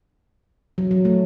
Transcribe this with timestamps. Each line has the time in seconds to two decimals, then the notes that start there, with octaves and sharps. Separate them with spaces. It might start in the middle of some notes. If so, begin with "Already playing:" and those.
0.78 F#3
0.91 F#3
1.05 A3